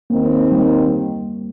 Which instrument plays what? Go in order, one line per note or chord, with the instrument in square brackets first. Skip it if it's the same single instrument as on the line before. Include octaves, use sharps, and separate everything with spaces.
[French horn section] D#2 D#3 C4 [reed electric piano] A#3
[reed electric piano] G3